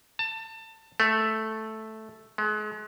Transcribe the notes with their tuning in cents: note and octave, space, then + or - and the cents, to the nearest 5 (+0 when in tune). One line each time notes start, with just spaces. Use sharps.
A5 +25
A3 -5
G#3 +35